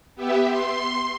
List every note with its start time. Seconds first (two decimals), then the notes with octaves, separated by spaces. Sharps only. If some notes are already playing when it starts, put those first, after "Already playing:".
0.15 B3 G4 E5
0.47 C6